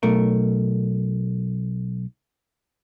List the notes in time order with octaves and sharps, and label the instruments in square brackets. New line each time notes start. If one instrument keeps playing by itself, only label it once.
[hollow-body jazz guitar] B1 A3 A#4